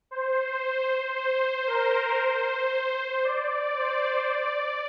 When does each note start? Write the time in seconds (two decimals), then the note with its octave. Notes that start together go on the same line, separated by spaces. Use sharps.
0.11 C5
1.15 C5
1.67 A#4
2.19 C5
3.24 D5
3.76 C5
4.29 D5